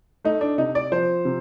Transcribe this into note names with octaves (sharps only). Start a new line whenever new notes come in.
A3 D#4
D4
C3 D#4
D5
F3 C5
C3